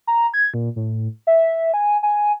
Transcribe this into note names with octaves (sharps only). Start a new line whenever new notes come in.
A#5
G#6
A#2
A2
E5
G#5
G#5